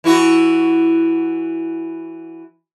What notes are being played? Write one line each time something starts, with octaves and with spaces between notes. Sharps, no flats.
E3 E4 F#4